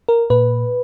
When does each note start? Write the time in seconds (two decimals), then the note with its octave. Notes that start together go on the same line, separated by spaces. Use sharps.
0.09 A#4
0.30 A#2 B4